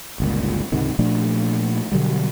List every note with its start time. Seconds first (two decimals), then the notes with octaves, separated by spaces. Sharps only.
0.20 G1 C#2 A#2
0.72 C#2 G#2 C3 D#3
0.99 A#2 F3 A3 D4
1.92 B2 D3 F#3 G3